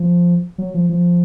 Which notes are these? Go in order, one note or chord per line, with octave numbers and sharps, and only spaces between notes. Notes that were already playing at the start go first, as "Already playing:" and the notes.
Already playing: F3
F#3
F3
F3